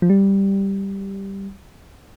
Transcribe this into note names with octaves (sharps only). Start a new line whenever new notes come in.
F3
G3